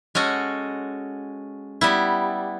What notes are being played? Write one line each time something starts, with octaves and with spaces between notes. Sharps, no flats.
G#3 C#4 F#4 A4
G3 B3 E4